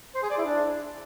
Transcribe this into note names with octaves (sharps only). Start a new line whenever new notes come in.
C5
G#4
D5
E4
D4